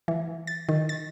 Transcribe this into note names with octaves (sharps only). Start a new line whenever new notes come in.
E3
A6
D#3
A6